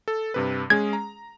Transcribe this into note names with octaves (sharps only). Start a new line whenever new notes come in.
A4
G2 C3 B4
G#3 C#4 G#4 G#6
A#5